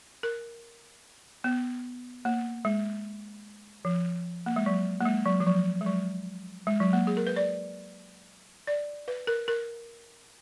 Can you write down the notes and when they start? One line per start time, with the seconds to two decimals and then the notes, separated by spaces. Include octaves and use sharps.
0.23 A#4
1.44 B3
2.25 A#3
2.65 G#3
3.85 F3
4.46 A#3
4.56 G#3
4.66 F#3
5.01 A#3
5.05 G#3
5.26 F#3
5.40 F3
5.47 F#3
5.81 G#3
5.86 F#3
6.67 G#3
6.80 F#3
6.93 A#3
7.07 G#4
7.17 A#4
7.27 B4
7.36 D5
8.67 D5
9.08 B4
9.27 A#4
9.48 A#4